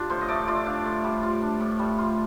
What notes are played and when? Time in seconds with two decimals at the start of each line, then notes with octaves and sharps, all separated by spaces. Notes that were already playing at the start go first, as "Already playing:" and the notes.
Already playing: D4 F4 G4
0.10 A2 C5
0.21 D#5
0.28 A3 D5
0.48 F4 D5
0.66 D4 F5
0.85 A2
1.04 G3
1.23 F4
1.42 D4
1.60 A2
1.79 G3
1.98 F4